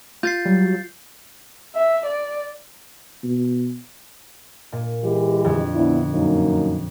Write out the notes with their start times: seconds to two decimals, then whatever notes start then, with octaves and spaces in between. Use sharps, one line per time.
0.23 F4 G6 A6 C7
0.45 F#3 G3
1.75 E5
2.06 D5
3.23 B2
4.72 A#2
5.04 E3 G#3 G4
5.44 F2 D3
5.75 B3 D4 E4
6.14 F#2 A#3 D#4